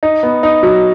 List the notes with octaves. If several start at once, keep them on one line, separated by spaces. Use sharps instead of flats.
D#4
B3
D#4
F#3